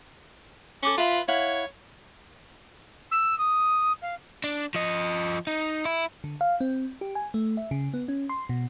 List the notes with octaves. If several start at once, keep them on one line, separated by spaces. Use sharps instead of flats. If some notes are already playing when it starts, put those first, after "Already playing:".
C#4 A4 D6 D#6
F4 B4 E5 B5
E4 C#5 F5 F#5
E6
D#6
F5
D4
F3 D#5
D#4
E4
D3
F5
C4
G4
G#5
A3
E5
C#3
B3
C#4
C6
B2